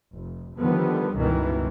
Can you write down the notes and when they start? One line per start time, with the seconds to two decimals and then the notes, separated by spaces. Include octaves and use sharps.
0.13 F1
0.58 D3 D#3 F3 G3 B3
1.15 G1 C#2 B2 D#3 E3